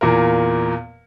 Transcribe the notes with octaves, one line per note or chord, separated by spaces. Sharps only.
E2 A#2 A#3 A#4